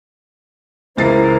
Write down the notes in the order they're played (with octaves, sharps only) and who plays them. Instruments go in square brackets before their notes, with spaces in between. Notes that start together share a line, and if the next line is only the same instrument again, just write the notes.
[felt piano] C#2 A6 C7 [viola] E3 A#4 [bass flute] C5